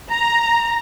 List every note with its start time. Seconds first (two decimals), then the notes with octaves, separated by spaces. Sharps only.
0.12 A#5